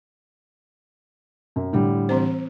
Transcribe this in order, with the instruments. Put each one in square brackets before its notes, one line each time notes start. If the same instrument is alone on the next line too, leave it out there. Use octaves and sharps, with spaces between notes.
[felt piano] F#2
A2 D3 G3
[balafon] E3 C4 C5